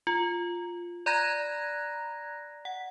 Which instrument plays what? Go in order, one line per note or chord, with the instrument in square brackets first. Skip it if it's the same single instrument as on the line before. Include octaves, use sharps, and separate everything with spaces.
[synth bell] F4
D5 A#5 B5 F#6 G#6 A#6
F#5